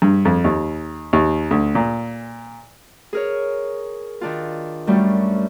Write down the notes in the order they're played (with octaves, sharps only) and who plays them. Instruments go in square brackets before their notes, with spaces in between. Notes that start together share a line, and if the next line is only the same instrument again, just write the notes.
[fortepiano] G2
F2
D#2
D#2
D2
A#2
[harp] G#4 A#4 C#5
D#3 D4 F4
F#2 G3 A3